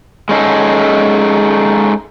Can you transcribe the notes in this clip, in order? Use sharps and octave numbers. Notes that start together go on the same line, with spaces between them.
G#3 C#4 D#4 G#4 A4